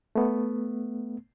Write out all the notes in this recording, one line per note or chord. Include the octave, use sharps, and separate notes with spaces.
A3 B3